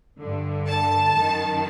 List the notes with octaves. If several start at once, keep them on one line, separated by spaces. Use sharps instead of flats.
G2 D3
A5
F#2 D#3